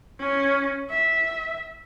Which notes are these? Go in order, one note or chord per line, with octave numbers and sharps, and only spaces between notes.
C#4
E5